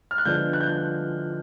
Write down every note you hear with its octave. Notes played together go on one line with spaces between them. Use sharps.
F6
F#6
D3 F3 G#3 B3 D4 G6
F#6
G6
F#6